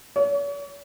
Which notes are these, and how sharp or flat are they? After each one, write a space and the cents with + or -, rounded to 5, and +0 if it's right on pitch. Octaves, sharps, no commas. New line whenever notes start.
C#5 +45